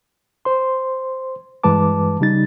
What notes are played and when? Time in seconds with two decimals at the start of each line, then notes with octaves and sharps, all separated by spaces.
0.45 C5 C6
1.63 G2 E3 G#3 B4 A5 D6
2.20 C#3 G3 D#4 A6